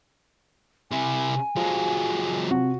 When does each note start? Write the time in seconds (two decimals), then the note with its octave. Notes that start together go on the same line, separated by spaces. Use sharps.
0.92 C3 E4 G#5
1.56 F3 F#3 G#3
2.51 C3 F#4